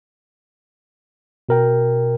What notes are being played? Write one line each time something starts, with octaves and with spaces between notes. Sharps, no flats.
B2 A#4 G5